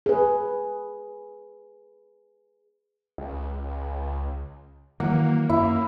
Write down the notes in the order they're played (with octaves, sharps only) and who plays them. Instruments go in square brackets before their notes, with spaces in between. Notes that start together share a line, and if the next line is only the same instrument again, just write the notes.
[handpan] G#4 B4
[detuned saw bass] C#2
[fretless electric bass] D#3 E3 F#3 [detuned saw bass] A#3 [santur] F#5
[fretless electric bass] F#2 [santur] E4